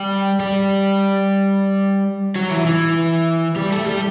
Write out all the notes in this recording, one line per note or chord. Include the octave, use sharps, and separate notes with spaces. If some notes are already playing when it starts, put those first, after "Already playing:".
Already playing: G3 G4
G3 G4
F#3 F#4
E3 E4
E3 E4
G3 G4
A3 A4
G3 G4